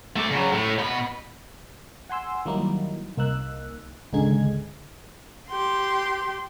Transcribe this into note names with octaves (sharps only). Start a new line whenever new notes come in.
A3 D5
C#3 F#3
A2
B2 B5
F#5 G#5 C6 E6
D#3 F#3 G3 A#3 D#4 E4
C2 A#3 D#4 E6 F#6
G#1 C#2 D3 D#4 G#4 G#6
G4 C6